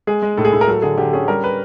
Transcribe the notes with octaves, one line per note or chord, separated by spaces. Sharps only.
G#3 G#4
G#3
A2 A4
G#4
A2 A4
A#4
F#3 A4
D3 G#4
D3 G4
C#4 G#4
G3 A#4
B4